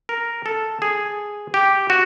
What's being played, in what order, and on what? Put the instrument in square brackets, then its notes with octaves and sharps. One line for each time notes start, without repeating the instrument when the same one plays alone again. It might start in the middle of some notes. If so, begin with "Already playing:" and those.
[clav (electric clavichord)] A#4
A4
G#4
G4
F#4